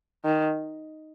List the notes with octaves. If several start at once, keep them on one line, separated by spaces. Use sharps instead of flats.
D#3